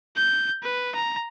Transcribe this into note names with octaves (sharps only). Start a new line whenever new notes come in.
G6
B4
A#5